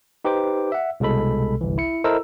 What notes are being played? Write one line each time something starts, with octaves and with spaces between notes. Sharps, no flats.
D#4 G4 B4 C5 D6
E5 F#5
C2 B2 G#3 A4 B5
G1 C2 E3
E4 C#7
E4 A4 A#4 C5 D#5 E6